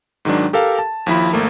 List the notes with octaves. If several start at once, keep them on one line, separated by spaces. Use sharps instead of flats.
G#2 D#3 F#3 D4
G4 A4 A#4 F5
A5
D#2 F3 E4 B5
G#1 A3 A#3